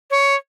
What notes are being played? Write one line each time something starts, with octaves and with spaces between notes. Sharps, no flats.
C#5